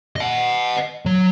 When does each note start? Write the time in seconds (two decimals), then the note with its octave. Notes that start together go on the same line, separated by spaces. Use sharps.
0.16 D#5 F#5
1.06 F#3